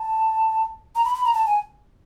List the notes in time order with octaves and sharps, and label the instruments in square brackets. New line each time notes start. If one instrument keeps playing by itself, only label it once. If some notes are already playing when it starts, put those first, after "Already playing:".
Already playing: [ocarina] A5
A#5
B5
B5
A#5
A5
G#5